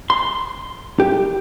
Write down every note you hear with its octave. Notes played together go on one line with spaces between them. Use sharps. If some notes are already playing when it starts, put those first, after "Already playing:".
C6
G4